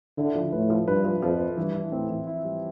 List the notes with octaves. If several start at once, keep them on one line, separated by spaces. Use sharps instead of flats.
D3 E4
F3
A2 B4
F3
G2 B4
F3
F2 F3
B4
G2 E3
E4
A2 C4
E3
E4
G3